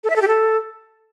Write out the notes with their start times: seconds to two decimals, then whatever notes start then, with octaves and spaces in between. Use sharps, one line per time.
0.04 A4
0.10 E5
0.16 A4
0.22 G4
0.28 A4